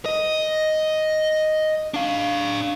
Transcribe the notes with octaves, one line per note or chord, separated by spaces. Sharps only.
D#5
D4 F5